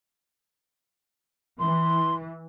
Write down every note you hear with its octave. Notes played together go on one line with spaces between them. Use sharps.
E3 C6